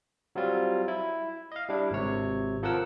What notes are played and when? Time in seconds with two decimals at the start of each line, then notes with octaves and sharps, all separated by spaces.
0.35 F#3 G3 C4 F4
0.88 E4
1.52 D#5 F5
1.69 G3 D4 E4
1.91 G#1 C3 C#5
2.63 F3 A4 A#4 F#5 E6